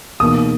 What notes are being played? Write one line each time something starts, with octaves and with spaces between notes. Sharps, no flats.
E2 B2 A#3 D#4 D#6